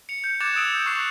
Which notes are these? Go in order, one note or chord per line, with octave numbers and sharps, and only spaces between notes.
C#7 F7
G6
D6 F#6 G#6 A6 E7 F7
D#6 E6 D7 F7
D6 E6 G6
C#6 F#6 C7 D7 E7